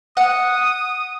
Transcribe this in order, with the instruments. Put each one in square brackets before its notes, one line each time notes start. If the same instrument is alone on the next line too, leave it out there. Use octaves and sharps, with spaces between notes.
[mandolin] F#5 [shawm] D#6